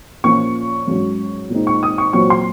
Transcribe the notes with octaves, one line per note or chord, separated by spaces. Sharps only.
A#2 F3 A#3 C#4 C#6
G#2 F#3 C#4
A#2 G#3 C4 D#4
C#6
D#6
C#6
A#2 F#3 C4 C#6
C6